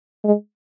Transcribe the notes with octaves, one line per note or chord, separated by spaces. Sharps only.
G#3